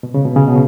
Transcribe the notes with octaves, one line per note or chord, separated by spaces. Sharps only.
B2
C#3
B2
C#3
B2